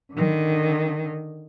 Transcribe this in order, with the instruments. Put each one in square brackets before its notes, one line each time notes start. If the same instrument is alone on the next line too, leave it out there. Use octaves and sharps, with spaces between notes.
[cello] D3 D#3